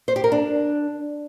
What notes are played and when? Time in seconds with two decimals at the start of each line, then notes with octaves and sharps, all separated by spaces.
0.08 C5
0.16 G4
0.24 A#4
0.32 D4